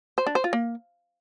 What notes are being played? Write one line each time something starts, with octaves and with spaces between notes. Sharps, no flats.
C5
D4
C5
F4
A#3